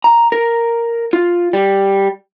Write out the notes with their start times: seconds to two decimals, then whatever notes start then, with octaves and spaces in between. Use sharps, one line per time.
0.04 A#5
0.32 A#4
1.13 F4
1.53 G3